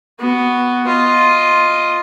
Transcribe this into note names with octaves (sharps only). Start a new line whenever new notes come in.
B3 F#4
F4 D#5